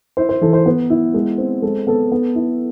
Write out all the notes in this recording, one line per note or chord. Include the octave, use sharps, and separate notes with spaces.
E4 C5
C5
E3 A4
C5
B3 B4
E4
G#3
C4
G#3 A4
B3 A4
B3
E4